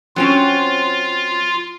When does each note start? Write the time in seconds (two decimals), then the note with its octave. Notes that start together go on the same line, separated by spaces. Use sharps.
0.16 F#3 C4 C#4 F4